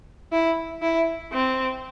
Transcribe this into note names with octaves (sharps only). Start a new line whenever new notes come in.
E4
E4
C4